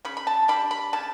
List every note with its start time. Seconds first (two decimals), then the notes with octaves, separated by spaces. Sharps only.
0.05 C#3 B5
0.17 B5
0.27 A5
0.48 G3 D4 B5
0.71 B5
0.93 C#3 A5